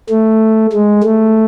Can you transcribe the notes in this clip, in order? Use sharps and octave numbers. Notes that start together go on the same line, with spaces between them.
A3
G#3
A3